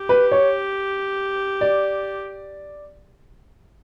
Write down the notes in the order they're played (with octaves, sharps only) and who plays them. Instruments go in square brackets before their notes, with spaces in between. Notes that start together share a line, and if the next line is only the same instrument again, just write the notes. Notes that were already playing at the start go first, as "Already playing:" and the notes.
Already playing: [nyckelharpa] G4
[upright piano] B4
C#5
D5